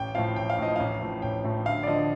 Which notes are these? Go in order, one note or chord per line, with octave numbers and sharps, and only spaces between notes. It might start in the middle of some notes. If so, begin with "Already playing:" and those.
Already playing: A1 G5
A2 F3 F5
A1 G5
F5
A2 F3 D#5
A1 F5
A2 F3
A1 G5
A2 F3
D2 F5
D5
D3 F3 D#5